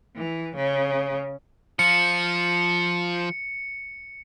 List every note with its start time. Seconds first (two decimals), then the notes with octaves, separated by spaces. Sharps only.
0.16 E3
0.56 C#3
1.79 F3 F4 C#7